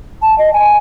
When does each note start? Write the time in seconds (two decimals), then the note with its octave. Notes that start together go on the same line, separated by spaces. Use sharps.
0.22 A5
0.38 D#5
0.53 G#5